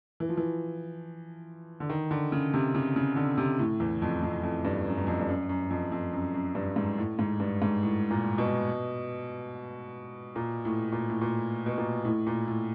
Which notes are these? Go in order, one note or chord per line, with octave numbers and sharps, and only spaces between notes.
E3
F3
E3
D3
D#3
D3
C#3
C3
C#3
C#3
D3
C3
A2
E2
F2
F2
F2
G2
F#2
F#2
F2
G2
F#2
F#2
F2
F2
F#2
F#2
G2
G#2
A2
G#2
G2
G#2
A2
A#2
B2
A#2
A2
A#2
A2
A#2
B2
A#2
A2
A#2
A2